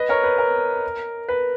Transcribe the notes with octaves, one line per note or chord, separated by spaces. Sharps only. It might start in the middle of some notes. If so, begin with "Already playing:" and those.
Already playing: B4 D#5
A#4 C#5
B4
A#4
B4